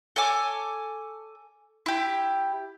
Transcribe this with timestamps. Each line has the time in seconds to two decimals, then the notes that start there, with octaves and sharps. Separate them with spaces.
0.16 A4 C#5 G#5 D6
1.86 E4 G4